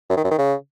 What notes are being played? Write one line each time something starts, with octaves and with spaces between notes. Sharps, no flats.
F#2
D#3
F#2
D#3
C#3